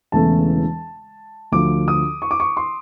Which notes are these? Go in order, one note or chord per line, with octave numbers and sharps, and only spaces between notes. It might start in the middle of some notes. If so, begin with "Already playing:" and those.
E1 E2 C#3 E3 A3 A5
D2 D3 F3 D6
D#6
C#6
D6
C#6
C6